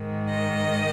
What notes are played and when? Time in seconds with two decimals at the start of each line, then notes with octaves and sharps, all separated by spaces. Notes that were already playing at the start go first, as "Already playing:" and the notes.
Already playing: G#2 D#3
0.28 D#5